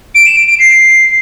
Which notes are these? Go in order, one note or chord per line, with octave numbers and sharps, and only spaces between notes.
D7
E7
D7
D7
C7